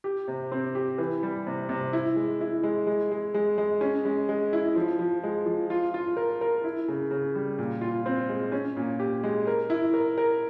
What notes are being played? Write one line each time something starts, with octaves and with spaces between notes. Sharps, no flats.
G4
C3
C4
G4
E3
G3
C3
C3
E4
G#3
E4
G#3
G#3
G#3
G#3
G#3
C#4
G#3
G#3
E4
F3
F3
G#3
F3
F4
F4
A#4
A#4
E4
C#3
C#3
G3
A#2
F4
C4
G#3
C#4
A#2
G4
G#3
A#4
E4
A#4
A#4